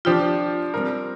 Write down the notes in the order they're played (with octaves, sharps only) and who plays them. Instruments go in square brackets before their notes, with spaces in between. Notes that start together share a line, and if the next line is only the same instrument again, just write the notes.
[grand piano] F3 D4 G4 [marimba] F4
[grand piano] G3 C4 A#4